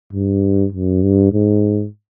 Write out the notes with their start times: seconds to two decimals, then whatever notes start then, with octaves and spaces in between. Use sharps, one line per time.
0.13 G2
0.72 F#2
1.03 G2
1.33 G#2